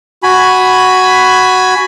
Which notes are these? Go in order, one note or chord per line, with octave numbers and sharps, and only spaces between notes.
F#4 G#5 B5